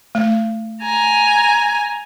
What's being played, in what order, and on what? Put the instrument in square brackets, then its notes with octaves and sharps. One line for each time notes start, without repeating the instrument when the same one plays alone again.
[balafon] A3
[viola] G#5 A#5